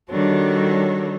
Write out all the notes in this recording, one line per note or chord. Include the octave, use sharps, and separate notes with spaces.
D#3 G3 D4 F#4 A4 C#5